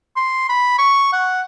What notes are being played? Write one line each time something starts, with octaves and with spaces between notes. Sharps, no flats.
C6
B5
C#6
F#5